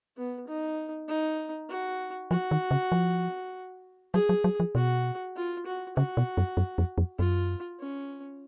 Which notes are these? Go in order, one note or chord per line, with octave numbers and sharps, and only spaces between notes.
B3
D#4
D#4
F#4
F3 F#4
D#3
C#3
F3
F#3 G#4
F#3
F#3
F3
B2 F#4
F4
F#4
C#3 F#4
B2
F#2
F#2
F2
F2
F#2 F4
C#4